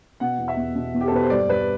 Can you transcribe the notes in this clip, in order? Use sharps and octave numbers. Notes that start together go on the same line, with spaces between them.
B2 F#5
E2
E5
E2
B2
E2
G4
A4
B2 B4
C5
G2 D5
G2 B4